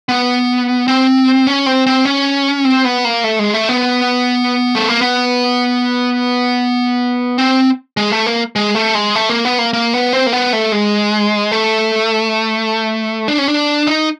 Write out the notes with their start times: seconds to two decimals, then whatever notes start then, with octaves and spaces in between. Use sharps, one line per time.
0.09 B3
0.88 C4
1.47 C#4
1.66 C4
1.86 C4
2.05 C#4
2.65 C4
2.85 B3
3.05 A#3
3.24 A3
3.39 G#3
3.54 A3
3.69 B3
4.75 A3
4.88 A#3
5.01 B3
7.38 C4
7.97 G#3
8.12 A3
8.26 A#3
8.56 G#3
8.75 A3
8.95 G#3
9.15 A3
9.29 A#3
9.45 B3
9.59 A#3
9.73 A#3
9.94 B3
10.13 C4
10.26 A#3
10.33 B3
10.53 A3
10.72 G#3
11.52 A3
13.28 D4
13.39 C#4
13.48 D4
13.87 D#4